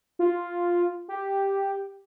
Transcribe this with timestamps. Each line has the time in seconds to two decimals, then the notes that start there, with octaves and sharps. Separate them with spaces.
0.19 F4
1.08 G4